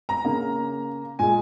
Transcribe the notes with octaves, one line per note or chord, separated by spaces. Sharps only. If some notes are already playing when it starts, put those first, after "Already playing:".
A#5
C#3 A#3
A#2 G#3 G#5